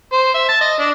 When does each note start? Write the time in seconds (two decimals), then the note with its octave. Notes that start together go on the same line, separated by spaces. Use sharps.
0.13 C5
0.34 E5
0.49 A5
0.61 D#5
0.80 D4